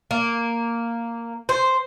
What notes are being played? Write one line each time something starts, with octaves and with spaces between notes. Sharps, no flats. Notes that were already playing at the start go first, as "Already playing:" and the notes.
A#3
C5